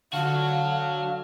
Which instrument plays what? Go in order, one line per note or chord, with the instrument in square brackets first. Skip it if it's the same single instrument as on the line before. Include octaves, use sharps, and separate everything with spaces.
[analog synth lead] D3 [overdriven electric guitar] F#3 F#4 [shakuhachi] F5 [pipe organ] A5 F6